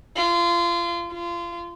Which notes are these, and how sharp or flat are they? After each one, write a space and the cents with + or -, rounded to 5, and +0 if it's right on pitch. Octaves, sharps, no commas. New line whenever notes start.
F4 -25
F4 -25